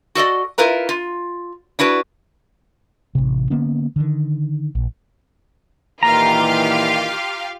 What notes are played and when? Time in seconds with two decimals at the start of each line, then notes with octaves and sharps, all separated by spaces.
0.15 F#4 A4 D5 D#5
0.58 E4 F4 A#4 B4 A#5
0.89 F4
1.79 D4 E4 F#4 B4
3.15 A1 C3
3.50 D3 A#3 B3 C#4
3.96 D3 D#3
4.75 A#1
6.03 A#2 D#3 E3 F4 G4 F5 A#5